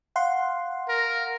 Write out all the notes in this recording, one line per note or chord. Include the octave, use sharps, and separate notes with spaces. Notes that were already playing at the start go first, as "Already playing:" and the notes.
F5 F#5 C6
A#4